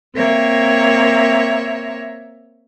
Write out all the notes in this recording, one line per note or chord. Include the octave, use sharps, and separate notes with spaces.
A#3 C4 C#5 E5